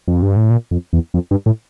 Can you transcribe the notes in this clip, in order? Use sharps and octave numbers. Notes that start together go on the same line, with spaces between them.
F2
G2
A2
A#2
F2
E2
F2
G2
A2